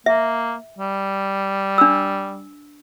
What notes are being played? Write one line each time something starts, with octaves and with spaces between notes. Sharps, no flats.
A#3 E5
G3
D4 E6